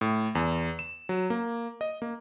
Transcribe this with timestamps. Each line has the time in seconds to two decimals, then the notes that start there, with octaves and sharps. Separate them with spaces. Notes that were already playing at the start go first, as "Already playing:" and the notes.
0.01 A2
0.35 E2
0.79 E7
1.09 F#3
1.30 A#3
1.81 D#5
2.02 A#3